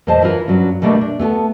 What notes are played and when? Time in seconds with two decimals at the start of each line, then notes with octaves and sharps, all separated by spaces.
0.07 E2 A#2 G#3 C5 D#5 A5
0.22 E3 E4 F4 A#4 B4
0.48 G2 F#3 C#4
0.82 B2 G3 A3 A#3 C4 D4
1.01 D4
1.19 A3 B3 G4 A4